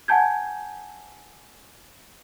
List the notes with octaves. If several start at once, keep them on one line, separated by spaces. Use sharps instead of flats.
F#5 G#5 A5 G6 G#6